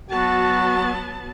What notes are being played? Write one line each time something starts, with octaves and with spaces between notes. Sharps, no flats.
F#3 B3 F#4 A5